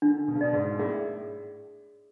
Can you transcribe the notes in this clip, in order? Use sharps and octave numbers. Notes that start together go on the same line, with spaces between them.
D3 D4
B2
C#3
B2 D5
G#2
A2 G#4